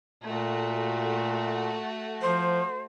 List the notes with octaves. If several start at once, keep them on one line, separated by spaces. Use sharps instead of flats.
A#2 A3 F#4
F3 C5